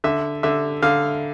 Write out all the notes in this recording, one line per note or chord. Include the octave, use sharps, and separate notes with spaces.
D3 E5
D3 E5
D3 F5